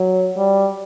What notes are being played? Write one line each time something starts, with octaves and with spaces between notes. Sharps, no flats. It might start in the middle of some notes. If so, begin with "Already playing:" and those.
Already playing: F#3
G3